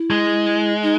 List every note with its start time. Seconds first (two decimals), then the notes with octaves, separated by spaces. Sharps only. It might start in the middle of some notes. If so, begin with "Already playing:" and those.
Already playing: E4
0.11 G#3
0.83 D#4